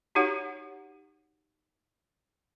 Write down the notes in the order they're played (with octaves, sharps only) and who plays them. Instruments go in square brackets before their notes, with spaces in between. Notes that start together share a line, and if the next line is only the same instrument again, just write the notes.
[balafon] D#4 F#4 G4 C#5 F#5